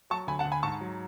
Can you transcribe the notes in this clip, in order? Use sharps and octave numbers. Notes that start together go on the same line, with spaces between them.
F#3 A5 C#6
D2 G#5 B5
F#5 A5
D2
G#5 B5
G#2 A5 C#6
F#3